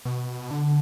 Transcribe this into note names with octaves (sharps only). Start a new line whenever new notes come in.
B2
D3